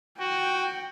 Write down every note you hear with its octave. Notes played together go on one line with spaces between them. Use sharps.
F#4 G5